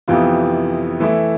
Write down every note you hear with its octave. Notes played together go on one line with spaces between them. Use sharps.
F2 C3 E3 B3 F4
E3 A3 E4